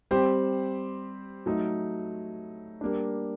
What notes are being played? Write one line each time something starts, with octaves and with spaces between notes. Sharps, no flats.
G3 C4 G4 C5
F#3 A3 D#4
G3 A#3 D4